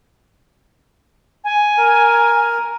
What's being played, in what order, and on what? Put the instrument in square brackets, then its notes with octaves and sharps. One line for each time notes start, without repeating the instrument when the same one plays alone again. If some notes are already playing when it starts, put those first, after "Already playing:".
[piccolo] G#5
[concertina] A#4